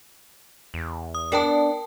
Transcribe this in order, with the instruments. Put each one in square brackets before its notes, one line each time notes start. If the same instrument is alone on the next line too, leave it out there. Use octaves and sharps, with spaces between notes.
[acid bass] E2
[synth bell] D#6
[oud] B3 D4 [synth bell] A#4 G5 A5